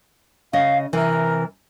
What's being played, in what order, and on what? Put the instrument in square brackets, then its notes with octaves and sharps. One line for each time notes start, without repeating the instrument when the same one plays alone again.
[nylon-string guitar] C#3 D#5 [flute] F5
[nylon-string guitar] C3 E3 [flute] A#4